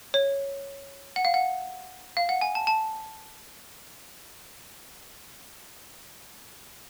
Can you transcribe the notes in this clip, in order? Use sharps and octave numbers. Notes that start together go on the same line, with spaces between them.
C#5
F#5
F5
F#5
F5
F#5
G#5
A5
A5